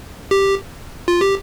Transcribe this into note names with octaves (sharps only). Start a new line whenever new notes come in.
G4
F4
G4